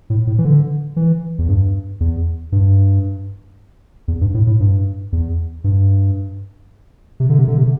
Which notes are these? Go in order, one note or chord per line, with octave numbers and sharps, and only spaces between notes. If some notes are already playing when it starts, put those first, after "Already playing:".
A2
A2
E3
D3
E3
E2
G2
E2
G2
E2
G2
A2
A2
G2
E2
G2
C3
D3
C3
D3
C3